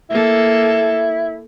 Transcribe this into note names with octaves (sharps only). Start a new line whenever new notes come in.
A#3 E4 A4